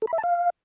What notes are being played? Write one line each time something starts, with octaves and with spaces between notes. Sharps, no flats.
A4
B5
E5
A5
F5